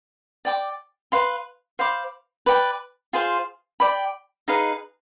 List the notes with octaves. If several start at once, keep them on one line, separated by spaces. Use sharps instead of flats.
D5 G5 D6
B4 F5 C6
C5 F5 B5 D6
B4 D5 G5
F4 G#4 C5 F5
D5 G5 B5
D#4 G#4 B4 F5